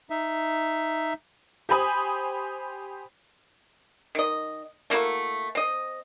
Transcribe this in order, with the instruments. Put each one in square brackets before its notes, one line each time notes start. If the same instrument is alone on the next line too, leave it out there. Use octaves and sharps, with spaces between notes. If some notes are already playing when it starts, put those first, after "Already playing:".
[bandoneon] D#4 E5
[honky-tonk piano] G4 C5 G#5 B5 D#6
[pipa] D#3 D#5
A3 A#3 E4 F#4
C4 D#5